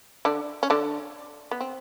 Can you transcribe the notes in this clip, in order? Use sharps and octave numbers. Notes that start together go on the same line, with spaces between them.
D3 D4
C#4
D3 D4
B3
C4